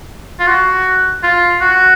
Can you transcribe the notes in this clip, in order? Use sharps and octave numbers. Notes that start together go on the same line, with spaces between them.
F4
F#4
F4
F#4